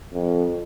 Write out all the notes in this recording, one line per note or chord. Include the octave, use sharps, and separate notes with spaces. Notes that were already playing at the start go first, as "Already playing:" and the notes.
F2